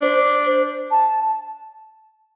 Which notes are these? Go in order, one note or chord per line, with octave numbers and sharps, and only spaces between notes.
D4 C5
C5
A5